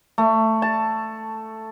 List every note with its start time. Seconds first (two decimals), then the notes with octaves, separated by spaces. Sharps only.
0.18 A3
0.62 A5